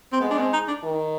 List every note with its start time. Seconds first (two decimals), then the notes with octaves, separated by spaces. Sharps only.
0.13 C4
0.20 G#3 B3
0.31 D4
0.38 B3
0.42 C4
0.53 D#4
0.68 D4
0.84 D#3